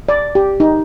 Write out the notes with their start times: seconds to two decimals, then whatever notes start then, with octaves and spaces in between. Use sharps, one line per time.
0.09 D5
0.35 G4
0.60 D#4